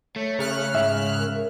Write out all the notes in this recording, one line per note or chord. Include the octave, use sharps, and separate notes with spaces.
A3 C#5
C#3 F6 F#6
G#2 E5
A#4
A#4